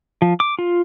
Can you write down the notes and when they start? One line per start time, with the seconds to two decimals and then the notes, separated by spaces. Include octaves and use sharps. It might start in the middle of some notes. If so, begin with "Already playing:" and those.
0.22 F3
0.40 D6
0.59 F4